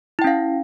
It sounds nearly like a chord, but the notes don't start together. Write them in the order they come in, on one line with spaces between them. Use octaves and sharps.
E4 G5 C#4 F5